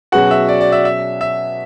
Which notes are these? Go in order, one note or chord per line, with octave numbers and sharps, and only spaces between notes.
B2 F#3 C#4 F#4 G#4 B4 F#5
E5
D5
D5
E5
E5
E5